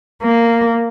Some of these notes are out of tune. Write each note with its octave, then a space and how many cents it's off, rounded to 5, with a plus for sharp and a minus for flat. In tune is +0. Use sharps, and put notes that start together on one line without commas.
A#3 -10